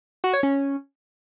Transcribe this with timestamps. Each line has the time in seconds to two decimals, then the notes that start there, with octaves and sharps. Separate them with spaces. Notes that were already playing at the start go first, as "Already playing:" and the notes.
0.24 F#4
0.33 C#5
0.43 C#4